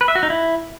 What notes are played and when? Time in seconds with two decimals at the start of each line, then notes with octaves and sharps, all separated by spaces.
0.01 B4
0.08 E5
0.15 F#4
0.23 D#4
0.30 E4